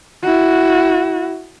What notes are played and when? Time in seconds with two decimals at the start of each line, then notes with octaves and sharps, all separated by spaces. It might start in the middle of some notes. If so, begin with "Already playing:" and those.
0.23 E4 F#4